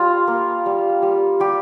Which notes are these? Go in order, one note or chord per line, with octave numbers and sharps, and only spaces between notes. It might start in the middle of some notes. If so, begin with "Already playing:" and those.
Already playing: G3 F4
A#3
G3
G3
G3 G4